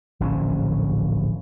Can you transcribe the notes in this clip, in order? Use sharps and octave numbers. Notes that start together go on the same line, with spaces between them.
D1 A#1 E3 C#4